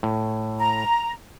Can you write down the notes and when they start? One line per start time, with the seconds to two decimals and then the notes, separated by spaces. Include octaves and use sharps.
0.03 A2
0.58 A#5